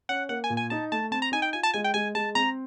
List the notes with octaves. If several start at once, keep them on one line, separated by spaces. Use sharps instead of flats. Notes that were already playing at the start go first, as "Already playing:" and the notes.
C#4 F#5
A#3 F#5
G#5
A#2
G#5
D#4 A5
A3 A5
C4 A5
A#5
D#4 G#5
G5
F4 G#5
A5
G#3 G#5
G5
G#3 G#5
G#3 A5
C4 A#5